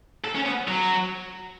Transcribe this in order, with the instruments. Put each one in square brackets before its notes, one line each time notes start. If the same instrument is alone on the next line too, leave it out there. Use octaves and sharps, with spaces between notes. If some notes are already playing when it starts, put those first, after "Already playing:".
[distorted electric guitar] A4
C#4
B3
F#3